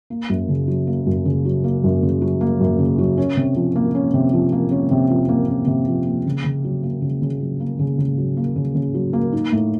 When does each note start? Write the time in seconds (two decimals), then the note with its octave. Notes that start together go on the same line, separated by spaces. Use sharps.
0.10 A#3
0.29 F#2
0.49 C#3
0.68 F#3
0.87 A#3
1.07 F#2
1.25 C#3
1.45 F#3
1.64 A#3
1.84 F#2
2.02 C#3
2.22 F#3
2.41 A#3
2.60 F#2
2.79 C#3
2.98 F#3
3.17 C#4
3.37 C3
3.56 F3
3.76 A#3
3.94 C#4
4.14 C3
4.33 F3
4.52 A#3
4.71 C#4
4.91 C3
5.10 F3
5.29 A#3
5.49 C#4
5.67 C3
5.87 F3
6.07 A#3
6.26 C#3
6.44 C#3
6.64 F#3
6.83 A#3
7.02 C#3
7.22 C#3
7.40 F#3
7.60 A#3
7.79 C#3
7.98 C#3
8.18 F#3
8.37 A#3
8.56 C#3
8.75 C#3
8.94 F#3
9.13 A#3
9.33 D#4
9.52 A2